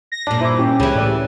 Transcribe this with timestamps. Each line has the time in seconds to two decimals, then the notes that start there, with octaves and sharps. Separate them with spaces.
0.12 A#6
0.27 G2 A#2 D4
0.41 E4 C5 D6
0.59 C#4 G4
0.80 C#2 C#3 E3 B5
0.95 A2 D5